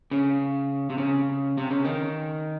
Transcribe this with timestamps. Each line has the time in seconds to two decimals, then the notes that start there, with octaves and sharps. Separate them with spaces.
0.11 C#3
0.90 C3
0.98 C#3
1.58 C3
1.71 C#3
1.85 D#3